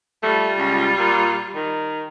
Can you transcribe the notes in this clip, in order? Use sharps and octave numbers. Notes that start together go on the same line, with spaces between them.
G3 A3 F4
C#2
A#2
D#3